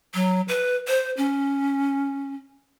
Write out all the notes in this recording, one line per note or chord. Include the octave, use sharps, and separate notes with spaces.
F#3
B4
C5
C#4